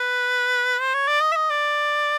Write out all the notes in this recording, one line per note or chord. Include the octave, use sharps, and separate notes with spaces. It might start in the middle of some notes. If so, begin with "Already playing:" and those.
Already playing: B4
C5
C#5
D5
D#5
E5
D#5
D5